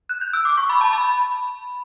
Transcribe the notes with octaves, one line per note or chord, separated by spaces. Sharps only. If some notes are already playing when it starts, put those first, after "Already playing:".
F#6
G6
E6
D6
C#6
B5
A5
B5